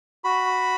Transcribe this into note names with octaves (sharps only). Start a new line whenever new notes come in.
F#4 B5